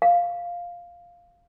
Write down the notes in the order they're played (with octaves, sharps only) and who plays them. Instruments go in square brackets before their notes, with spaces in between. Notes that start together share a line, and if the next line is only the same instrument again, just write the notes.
[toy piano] F5